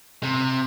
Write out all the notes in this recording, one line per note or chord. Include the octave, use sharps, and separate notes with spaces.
C3